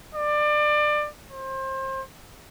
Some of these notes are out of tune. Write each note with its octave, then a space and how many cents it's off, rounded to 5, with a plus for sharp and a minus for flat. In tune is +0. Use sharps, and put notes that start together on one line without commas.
D5 +25
C5 +30